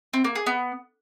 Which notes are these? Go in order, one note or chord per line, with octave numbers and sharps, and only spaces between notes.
C4
A#3
G#4
B3